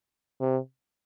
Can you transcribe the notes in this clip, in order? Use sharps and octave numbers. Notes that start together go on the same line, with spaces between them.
C3